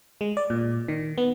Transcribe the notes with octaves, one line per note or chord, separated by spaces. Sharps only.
G#3
D5
A#2
D#3
B3